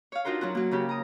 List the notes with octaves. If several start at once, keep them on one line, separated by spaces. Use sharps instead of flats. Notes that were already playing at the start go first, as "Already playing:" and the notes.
C#5 F5
D4 D#4 F4 F#4 A#4 C5
F#3 C#4 F#4
F#3 A#3
C#3 C#4 G4
A#5 D#6